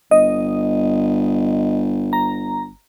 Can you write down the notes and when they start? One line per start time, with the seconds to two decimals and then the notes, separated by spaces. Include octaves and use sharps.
0.11 G1 D#5
2.13 A#5